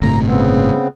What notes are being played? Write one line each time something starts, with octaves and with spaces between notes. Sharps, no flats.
G1 A2 C3 A#5
C#3 B3 C4